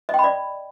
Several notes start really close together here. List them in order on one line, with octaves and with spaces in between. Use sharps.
D#5 G5 B5 D5